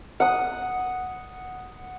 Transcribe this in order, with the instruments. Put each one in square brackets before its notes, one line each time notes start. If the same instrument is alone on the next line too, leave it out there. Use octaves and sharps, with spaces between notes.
[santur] F#5 D#6